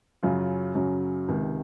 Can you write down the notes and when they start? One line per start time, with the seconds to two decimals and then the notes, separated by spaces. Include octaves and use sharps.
0.23 F#2 C#3 F#3 F4
0.75 F#2 C#3 F#3
1.28 C#2 C3 D#3